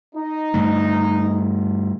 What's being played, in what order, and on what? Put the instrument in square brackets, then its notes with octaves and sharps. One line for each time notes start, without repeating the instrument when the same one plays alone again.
[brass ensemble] D#4
[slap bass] G2 D3 A3